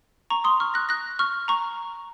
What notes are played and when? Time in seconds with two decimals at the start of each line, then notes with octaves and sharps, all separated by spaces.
0.30 A#5 C#6
0.44 C6 D#6
0.60 C#6 F6
0.74 F#6 A#6
0.89 F#6 A#6
1.19 C#6 F6
1.48 A#5 C#6